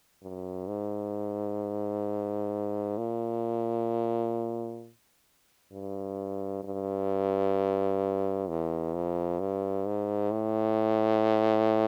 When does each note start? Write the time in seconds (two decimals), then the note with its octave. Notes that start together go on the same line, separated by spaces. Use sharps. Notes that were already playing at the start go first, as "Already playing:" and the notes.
0.22 F#2
0.67 G#2
2.98 A#2
5.72 G2
6.64 G2
8.48 E2
8.94 F2
9.40 G2
9.86 G#2
10.31 A2